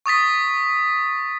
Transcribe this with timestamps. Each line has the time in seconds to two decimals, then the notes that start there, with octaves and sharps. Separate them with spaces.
0.06 C#6 D#6 A6 B6